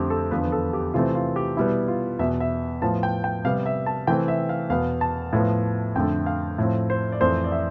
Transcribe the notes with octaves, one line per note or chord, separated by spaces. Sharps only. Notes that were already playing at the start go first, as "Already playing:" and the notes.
Already playing: F2 D3 A3 C4 G4
A4
E2 D3 F3 B3 B4
A4
G4
C3 E3 A3 C4 F4
F4
G4
B2 G3 B3 E4
F4
E2 B2 B3 E5
E5
A2 F3 B3 A5
G5
G5
C3 G3 B3 F5
E5
A5
C3 E3 A3 C4 G5
E5
F5
E2 B2 B3 F5
A5
A2 F3 B3
F2 D3 A3 G5
F5
A2 F3 C4
C5
D5
F2 E3 A3 C4 C5
D5
E5